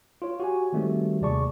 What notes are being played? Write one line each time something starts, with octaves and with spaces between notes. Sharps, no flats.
F4 C#5
F#4 G4 G#5
D#3 G3 A3 C4 F#4 G4
D#2 C3 G#4 D5 A5 C#6